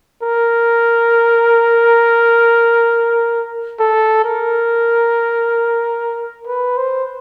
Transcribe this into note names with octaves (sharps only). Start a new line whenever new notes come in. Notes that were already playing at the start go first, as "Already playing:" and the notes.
A#4
A4
A#4
B4
C5